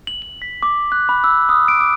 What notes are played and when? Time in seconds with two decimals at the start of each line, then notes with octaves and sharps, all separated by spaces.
0.07 F#7
0.22 F#7
0.42 B6
0.63 D6
0.92 F#6
1.09 B5
1.24 E6
1.49 D#6
1.68 D7
1.80 D6